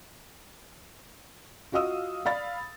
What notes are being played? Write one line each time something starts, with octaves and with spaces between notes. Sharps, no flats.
F4 F#4 D#5 F5 D#6 E6
D5 F5 B5 A6